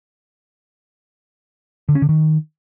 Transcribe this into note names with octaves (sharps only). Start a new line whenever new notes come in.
D3
C#4
D3
D#3